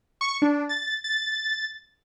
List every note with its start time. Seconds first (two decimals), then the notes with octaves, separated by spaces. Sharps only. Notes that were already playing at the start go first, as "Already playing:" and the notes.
0.21 C#6
0.42 D4
0.69 A6
1.04 A6